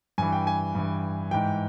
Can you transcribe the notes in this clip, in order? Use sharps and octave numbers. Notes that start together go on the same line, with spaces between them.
G2 E3 G#5
G5
G#5
G2 E3
G#2 E3 G5